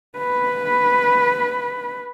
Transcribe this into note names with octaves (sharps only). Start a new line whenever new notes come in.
B4 B5